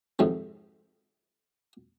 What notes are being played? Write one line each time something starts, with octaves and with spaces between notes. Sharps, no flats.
F2 G#2 C3 D#3